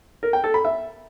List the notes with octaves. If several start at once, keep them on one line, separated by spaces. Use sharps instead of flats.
A#4
G5
A4
B5
E5